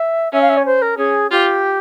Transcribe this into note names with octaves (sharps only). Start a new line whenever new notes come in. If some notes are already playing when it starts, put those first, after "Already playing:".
Already playing: E5
C#4 E5
F5
E5
C#5
C5
A#4
C#4 G#4
F4 G4